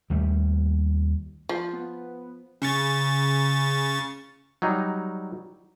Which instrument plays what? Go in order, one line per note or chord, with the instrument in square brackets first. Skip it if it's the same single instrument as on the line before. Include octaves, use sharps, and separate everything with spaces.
[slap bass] D#2 G3 A3
[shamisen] F3
[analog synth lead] B3
[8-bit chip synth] C#3 C#6 A6
[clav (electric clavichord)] F#3 G3 D#4